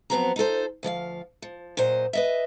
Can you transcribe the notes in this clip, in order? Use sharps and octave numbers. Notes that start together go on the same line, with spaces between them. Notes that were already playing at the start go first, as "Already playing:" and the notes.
F3 F#3 B3 C4 F#4 A#5
D#4 F4 A4 C5
D2 F3 D5 F5
F3
A#2 F#3 C5 D#5
B4 D#5 E5